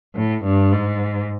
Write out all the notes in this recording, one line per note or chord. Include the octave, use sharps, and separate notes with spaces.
A2
G2
G#2